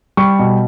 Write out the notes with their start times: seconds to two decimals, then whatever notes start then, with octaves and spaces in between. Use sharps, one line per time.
0.17 G3 C#6
0.39 B2